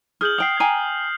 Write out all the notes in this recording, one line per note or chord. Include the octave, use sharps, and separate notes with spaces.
G#4 F6 G6 F#7
F#5 G5 D#6 C7
G5 G#5 A#5